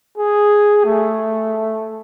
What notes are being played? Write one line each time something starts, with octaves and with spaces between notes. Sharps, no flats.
G#4
A3